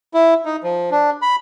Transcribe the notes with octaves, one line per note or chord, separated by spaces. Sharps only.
E4
D#4
F3
D4
B5